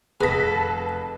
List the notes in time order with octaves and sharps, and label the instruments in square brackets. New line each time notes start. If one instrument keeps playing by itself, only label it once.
[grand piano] F1 D#6 [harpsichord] G#4 B5 [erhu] A4 [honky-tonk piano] B4 A#6 B6